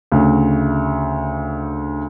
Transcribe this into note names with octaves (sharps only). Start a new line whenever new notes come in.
D2 C#3